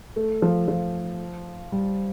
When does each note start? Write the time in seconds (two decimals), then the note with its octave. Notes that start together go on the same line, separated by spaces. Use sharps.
0.16 A3
0.42 F3
0.68 F3
1.72 G3